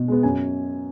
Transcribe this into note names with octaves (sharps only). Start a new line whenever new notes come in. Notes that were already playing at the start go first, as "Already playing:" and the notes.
Already playing: B2
G#3 B3
F#2 G#5